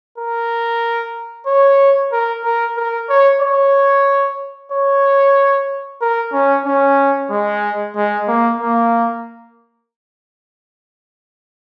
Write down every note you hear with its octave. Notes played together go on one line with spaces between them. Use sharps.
A#4
C#5
A#4
A#4
A#4
C#5
C#5
C#5
A#4
C#4
C#4
G#3
G#3
A#3
A#3